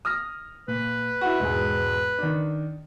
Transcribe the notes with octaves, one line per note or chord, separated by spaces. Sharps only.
D#6 F6 A#6
A#2 B4
E4 F#4
E1 G#2 G#4
D#3 D4